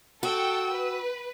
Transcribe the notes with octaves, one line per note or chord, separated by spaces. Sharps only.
F#4 A4 G5 E6
B4